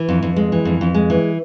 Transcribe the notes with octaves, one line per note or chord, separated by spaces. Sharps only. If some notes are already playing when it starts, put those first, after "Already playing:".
Already playing: E3
F2
F2
G#3
E3
F2
F2
G#3
E3